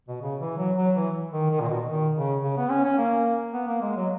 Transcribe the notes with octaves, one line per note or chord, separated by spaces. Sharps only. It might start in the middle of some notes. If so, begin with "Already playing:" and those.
B2
C#3
E3
F#3
F#3
E3
D#3
D#3
A#2
B2
D#3
C#3
C#3
B3
C#4
C#4
A#3
B3
A#3
G#3
F#3